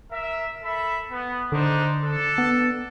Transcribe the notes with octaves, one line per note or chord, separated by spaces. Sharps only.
A#4 E5
A4 E5 B5
B3
D3 D4 D#4 C5
D4 A4
B3